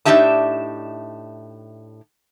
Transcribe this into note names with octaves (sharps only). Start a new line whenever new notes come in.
A2 D4 D#4 G4 E5 A5